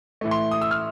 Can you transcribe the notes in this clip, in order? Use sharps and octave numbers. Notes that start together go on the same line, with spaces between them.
A2 E3 A3
C6
D#6
E6
F6